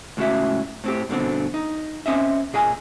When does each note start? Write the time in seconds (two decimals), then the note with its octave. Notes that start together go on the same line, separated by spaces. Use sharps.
0.17 C#2 A2 C#3 F#4 E5
0.84 A2 C4 G4
1.09 G2 B2 D3 C4
1.54 D#4
2.06 C4 C#4 D#5 E5
2.53 A#2 G#4 D#5 G#5